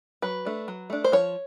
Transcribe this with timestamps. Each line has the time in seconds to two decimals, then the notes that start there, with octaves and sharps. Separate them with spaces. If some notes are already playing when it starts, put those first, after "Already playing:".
0.22 F#3 B4
0.45 A3 D4
0.68 F#3
0.90 A3 D4
1.04 C5
1.12 F3 C#5